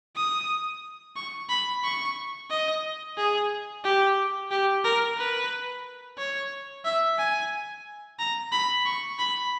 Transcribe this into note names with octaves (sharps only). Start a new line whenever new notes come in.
D#6
C#6
B5
C#6
D#5
G#4
G4
G4
A#4
B4
C#5
E5
G#5
A#5
B5
C#6
B5